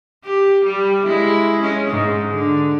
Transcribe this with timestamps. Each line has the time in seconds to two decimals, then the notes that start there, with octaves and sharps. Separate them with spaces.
0.24 G4
0.65 G3
1.04 G#3 E4
1.61 G#3 C#4
1.90 G#2 G#3
2.30 D3